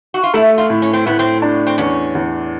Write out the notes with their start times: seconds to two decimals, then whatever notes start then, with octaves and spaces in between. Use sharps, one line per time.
0.14 F#4
0.24 F4
0.34 A3 E4
0.58 F4
0.70 A2
0.82 C#4
0.93 C4
1.06 A2 B3
1.19 C4
1.42 D4
1.67 C4
1.78 E2 C#4
2.15 E2